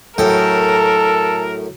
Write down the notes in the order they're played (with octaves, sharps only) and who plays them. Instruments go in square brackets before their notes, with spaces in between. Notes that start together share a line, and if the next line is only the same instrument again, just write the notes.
[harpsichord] F#2 A2 G5 [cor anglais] A4 [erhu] A#4